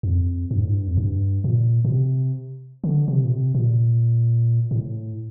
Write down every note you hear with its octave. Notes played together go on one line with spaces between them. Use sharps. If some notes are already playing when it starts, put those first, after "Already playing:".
F2
G2
A2
G2
F2
G2
A#2
A#2
C3
D3
C3
A#2
C3
A#2
A2